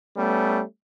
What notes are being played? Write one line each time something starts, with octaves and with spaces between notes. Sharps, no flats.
G3 A3 B3 C#4